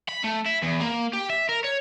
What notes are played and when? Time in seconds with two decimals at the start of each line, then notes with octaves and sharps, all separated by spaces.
0.09 B5
0.24 A3
0.46 E4
0.63 E2
0.81 A#3
1.13 G4
1.30 E5
1.49 A#4
1.64 C#5